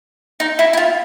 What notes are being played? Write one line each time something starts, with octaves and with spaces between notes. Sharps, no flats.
D#4
E4
E4
F4